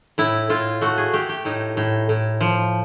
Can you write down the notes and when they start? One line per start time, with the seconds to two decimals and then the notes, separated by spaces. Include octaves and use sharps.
0.18 A2 E4
0.49 A2 F4
0.81 A3 F#4
0.98 G#4
1.13 A3 G4
1.29 G4
1.45 A2 D#4
1.77 A2
2.09 A2
2.41 F3